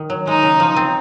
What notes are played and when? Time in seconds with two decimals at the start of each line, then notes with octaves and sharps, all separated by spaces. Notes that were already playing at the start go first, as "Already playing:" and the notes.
Already playing: D#3
0.10 F#3
0.27 G#3 D#4
0.43 C#3
0.60 F3
0.76 C4